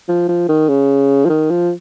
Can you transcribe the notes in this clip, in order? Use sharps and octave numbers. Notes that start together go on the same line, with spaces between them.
F3
F3
D#3
C#3
F3
D#3
F3